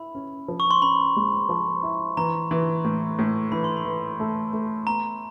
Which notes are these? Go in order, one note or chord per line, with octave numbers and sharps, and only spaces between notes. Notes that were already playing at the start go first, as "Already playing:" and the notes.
Already playing: E4 B5
C#4
F3
C#6
C6
C#4 B5
G#3
F3
E4
E3 A#5
E3
A2
A2
E3 B5
C6
B5
E3
A3
A3
B3 A#5